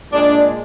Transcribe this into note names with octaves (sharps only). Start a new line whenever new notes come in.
A#2 G#3 D4